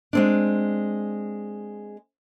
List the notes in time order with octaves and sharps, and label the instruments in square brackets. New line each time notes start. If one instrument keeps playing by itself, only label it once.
[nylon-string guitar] G#3 C4 D4